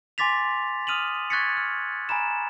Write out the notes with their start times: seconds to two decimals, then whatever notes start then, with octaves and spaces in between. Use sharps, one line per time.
0.18 G#5 C6 D6 A6 B6 F7
0.87 D#6 F6 D#7 F7 F#7
1.30 C#6 F#6 G#6 A6 B6 C#7
1.57 F6
2.09 G#5 A#5 B5 E7